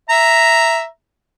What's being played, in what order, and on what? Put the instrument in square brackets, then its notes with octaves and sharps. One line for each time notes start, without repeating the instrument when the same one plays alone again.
[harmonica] E5 A#5